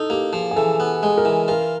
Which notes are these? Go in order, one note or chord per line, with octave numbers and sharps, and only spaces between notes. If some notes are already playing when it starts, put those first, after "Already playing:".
Already playing: D#4 A4
A#3 G4
F3 G#4
G#4
E3 A4
B3
G#3
A#4
E3
F4 A#4